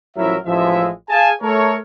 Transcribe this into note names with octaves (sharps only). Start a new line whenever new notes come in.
A1 F3 F#3 E4 A#4 E5
A1 F3 G#3 E5
G#4 F5 G#5 A5
A3 A4 A#4 C#5